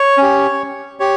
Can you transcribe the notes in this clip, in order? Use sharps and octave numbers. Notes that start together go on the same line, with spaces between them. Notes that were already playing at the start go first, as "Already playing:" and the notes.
Already playing: C#5
C#4 G4
G4 C#5